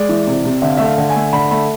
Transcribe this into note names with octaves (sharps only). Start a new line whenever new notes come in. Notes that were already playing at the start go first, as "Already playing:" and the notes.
Already playing: G#3 D5
E3
C3
C3
D3 E5
F5
A3 E5
F5
D3
G#5
A3
D3 B5
A3 B5